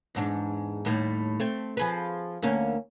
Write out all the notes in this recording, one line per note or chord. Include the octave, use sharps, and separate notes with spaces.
E2 G#2 D4
D#2 A2 G3
A3 C4
F3 G#4 B4
D2 A#3 C#4